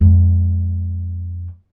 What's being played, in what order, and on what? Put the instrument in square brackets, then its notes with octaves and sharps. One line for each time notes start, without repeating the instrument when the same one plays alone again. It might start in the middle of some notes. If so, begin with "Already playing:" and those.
[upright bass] F2 G#3